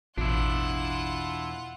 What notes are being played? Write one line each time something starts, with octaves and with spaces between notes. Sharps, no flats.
A1 E2 B2 D4 E4 F4 F#5